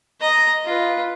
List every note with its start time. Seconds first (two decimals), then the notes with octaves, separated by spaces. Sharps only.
0.21 D#5 A#5
0.65 F4 B4